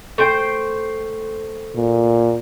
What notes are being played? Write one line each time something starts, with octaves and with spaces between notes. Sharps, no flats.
A3 C5 G5
A#2